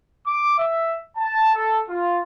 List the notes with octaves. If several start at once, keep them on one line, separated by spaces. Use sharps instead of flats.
D6
E5
A5
A4
F4